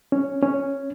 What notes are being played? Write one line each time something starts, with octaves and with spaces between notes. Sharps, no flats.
C#4
C#4